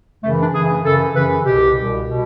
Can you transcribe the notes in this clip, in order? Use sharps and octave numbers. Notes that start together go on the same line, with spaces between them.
F#2 C#3 E3 A3
D4
F#2 C#3 E3 G#4
F#2 C#3 E3 A4
F#2 C#3 E3 B4
C2 B2 G4
C2 B2
B2